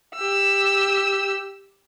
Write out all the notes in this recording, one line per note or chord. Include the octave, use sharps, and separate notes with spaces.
G4 E6